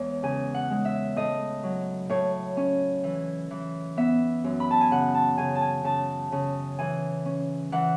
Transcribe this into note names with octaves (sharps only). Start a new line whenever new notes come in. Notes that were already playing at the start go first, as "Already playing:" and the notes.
Already playing: E2 G#3 C#5
C#3 G#5
F#5
G#3
E5
A2 D#5
F#3
A2 C#5
C#4
E3
E3
B3 E5
F#2
B5
A5
G#5
C#3 F#5
A5
C#3 G#5
A5
G#5
C#3 A5
C#3
E3 G#5
C#4
E3 F#5